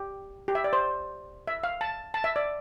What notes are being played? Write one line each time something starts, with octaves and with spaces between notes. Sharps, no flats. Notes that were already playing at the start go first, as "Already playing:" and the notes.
Already playing: G4
G4
E5
D5
C5
E5
F5
A5
A5
E5
D5